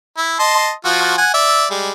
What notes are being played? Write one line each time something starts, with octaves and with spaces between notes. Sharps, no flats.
E4
D#5 A5 C6
F3 F4 F#4
F#5 G#5
D5 E5
G3 G#3